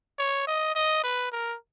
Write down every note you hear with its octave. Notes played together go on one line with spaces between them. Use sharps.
C#5
D#5
D#5
B4
A#4